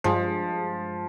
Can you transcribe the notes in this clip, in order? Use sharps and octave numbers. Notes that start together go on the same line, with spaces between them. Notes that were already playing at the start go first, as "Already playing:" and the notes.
G2 F3 G#3